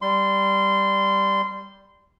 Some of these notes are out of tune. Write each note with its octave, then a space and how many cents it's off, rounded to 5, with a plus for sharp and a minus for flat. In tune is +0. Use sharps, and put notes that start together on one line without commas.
G3 +0 C6 -20